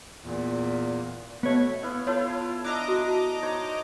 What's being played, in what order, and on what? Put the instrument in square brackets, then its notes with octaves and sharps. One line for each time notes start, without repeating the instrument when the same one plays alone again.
[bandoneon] E2 A#2
[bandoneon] B2 A3 [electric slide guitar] B3 C#5
[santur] B3 E4 F5
[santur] E4 A4 [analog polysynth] F4 [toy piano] C#5
[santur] D4 E5 [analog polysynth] D#5 A#5 D6
[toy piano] F#4
[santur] D#4 C5 C#5